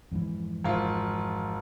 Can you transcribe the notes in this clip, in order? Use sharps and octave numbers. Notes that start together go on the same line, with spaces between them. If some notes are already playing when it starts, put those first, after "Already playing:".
F2 G#2 E3
G#1 F4